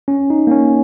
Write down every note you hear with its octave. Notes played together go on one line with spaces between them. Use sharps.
C#4
D#4
A#3
C#4